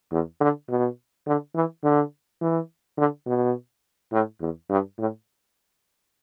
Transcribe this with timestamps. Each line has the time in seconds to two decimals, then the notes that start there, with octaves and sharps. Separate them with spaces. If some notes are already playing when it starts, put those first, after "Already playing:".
0.12 E2
0.41 D3
0.69 B2
1.26 D3
1.55 E3
1.83 D3
2.41 E3
2.98 D3
3.26 B2
4.12 A2
4.41 E2
4.69 G2
4.98 A2